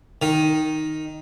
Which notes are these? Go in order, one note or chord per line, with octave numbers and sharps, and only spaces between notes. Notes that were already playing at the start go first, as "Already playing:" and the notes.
D#3